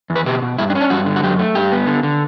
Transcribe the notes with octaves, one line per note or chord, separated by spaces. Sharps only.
E2
B4
B2 G4
B2
G2 E4
D4
C#4
D4
G2 F#4
D3
F#4
F#2 G4
A3
G2 G4
B3
D3
D3